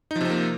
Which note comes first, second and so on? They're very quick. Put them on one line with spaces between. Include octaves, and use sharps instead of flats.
D#4 F3 C3 C4 A#3